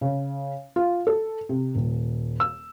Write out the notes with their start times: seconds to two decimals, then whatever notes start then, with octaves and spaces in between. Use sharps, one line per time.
0.01 C#3
0.76 F4
1.07 A4
1.49 C3
1.75 D#1
2.40 E6